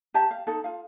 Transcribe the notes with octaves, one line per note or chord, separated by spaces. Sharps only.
G4 E5 A5 A#5
F5
D#4 A4
F4 F5